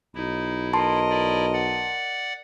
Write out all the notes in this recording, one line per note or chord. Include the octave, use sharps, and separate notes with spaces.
B1 D#4 E4
A#4 D#5 A5 C6
E4 D5
D5 F#5